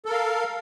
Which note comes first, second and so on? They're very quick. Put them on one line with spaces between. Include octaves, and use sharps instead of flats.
A4 A#4 F5